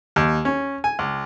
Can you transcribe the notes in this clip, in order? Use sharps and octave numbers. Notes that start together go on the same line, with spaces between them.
D#2
C#4
G#5
C#2